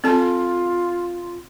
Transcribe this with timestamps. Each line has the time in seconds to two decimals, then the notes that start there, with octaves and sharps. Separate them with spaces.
0.04 C4 F4 A4 A5